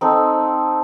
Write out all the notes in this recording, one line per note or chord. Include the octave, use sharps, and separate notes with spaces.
C4 D#4 A4